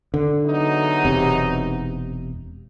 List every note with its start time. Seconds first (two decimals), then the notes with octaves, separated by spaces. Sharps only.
0.14 D3
0.45 E2 F#3 D#4
1.05 E1 C3